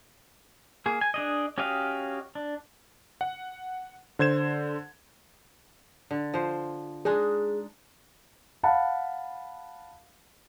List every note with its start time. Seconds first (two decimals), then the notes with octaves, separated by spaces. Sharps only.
0.86 A#3 G#4
1.01 G#5
1.14 D4 G#4 D#5
1.58 C#4 F#4 G4 D#5 F5
2.35 D4
3.21 F#5
4.19 D3 C5 G#6 E7
6.11 D3
6.34 F3 C5
7.05 G#3 D4 D#4 G#4
8.63 F5 F#5 A5 B5